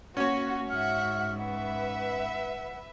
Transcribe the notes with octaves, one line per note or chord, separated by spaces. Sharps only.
A#3 C#4 F#4 C#5
G#2 F#4 E5 F#5 F6
B4 E5 F#5